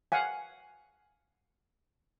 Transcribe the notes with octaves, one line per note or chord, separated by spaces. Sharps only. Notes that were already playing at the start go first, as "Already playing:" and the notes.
F5 F#5 G#5